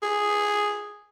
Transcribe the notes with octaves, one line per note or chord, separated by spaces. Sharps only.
G#4